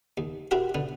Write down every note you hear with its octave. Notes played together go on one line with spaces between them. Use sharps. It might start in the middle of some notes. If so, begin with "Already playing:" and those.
D#2
C4 E4 F#4 G4 A#4
D3 B3